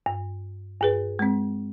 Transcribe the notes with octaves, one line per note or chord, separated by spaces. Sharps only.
G2
G2 G#4 B4
G#3 C4